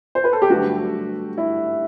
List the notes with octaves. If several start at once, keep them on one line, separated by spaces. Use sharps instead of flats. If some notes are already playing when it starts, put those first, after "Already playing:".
C5
B4
A4
G4
G2 D3 F#3 A3 F#4
E4